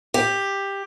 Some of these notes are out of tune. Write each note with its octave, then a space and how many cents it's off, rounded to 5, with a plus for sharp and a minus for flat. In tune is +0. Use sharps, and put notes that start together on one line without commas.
G4 +10